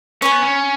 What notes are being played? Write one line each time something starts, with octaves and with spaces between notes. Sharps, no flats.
C#4 C#5 G#5 B5
B3
C#4